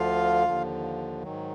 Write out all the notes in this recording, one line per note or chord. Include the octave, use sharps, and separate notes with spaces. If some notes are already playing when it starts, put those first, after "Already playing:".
Already playing: D2 D3 F3 F4 F5
D#2 D3 F3
G#2 D#3 F#3